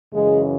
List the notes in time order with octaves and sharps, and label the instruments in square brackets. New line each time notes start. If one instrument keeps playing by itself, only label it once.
[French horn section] F#2 C#3 E3 G#3